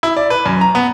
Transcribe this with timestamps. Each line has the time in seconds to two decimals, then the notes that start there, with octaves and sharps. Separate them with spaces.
0.03 E4
0.17 D5
0.30 B4
0.46 F#2
0.61 A#5
0.75 B3